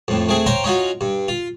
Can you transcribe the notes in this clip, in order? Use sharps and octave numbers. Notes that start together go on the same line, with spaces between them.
F2 A2
A3 C4 G#4
C5 C#5 F5 G5 A#5 C6
C#4 D#4 F4 F#4
G2
F4